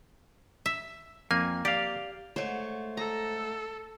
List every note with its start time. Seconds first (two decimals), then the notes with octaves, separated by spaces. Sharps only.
0.66 E5
1.31 F2 A#3 G#5
1.65 G4 D5 F5
2.36 G#2 A3 C5 C#5
2.97 A4 A#5